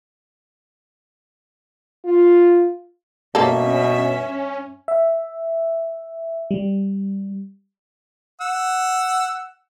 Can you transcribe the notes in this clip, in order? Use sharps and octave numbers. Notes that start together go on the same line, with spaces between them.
F4
G2 B2 A#3 C#4 A4 E5
E5
G3
F#5 E6